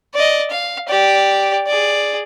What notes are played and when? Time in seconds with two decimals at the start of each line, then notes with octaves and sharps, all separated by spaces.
0.15 D5 D#5
0.51 F5
0.88 G4 D5
1.67 G#4 D5